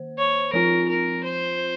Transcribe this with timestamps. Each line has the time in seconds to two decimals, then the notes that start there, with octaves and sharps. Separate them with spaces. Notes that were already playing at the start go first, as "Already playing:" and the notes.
Already playing: D#3 A#3 C5
0.18 C#5
0.53 F3 C4 F4 A#4
0.88 A#4
1.24 C5